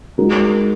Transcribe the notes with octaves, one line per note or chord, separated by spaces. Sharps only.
G#3 D#4 F#4 A#4